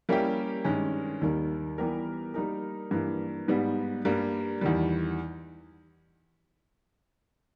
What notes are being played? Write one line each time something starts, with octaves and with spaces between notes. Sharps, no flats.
G3 A#3 C#4 E4 G4
G2 D#3 G#3 C#4
D#2 D#3 G3 A#3
E3 G3 B3 G4 A#4
G3 A#3 D#4 A#4
G2 E3 A#3
G#2 G3 B3
G2 G3 A#3
E2 D#3 G3